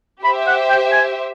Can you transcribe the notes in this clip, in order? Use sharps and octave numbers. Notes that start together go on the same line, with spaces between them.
G4 C5 E5 B5
F#5
G5
G#5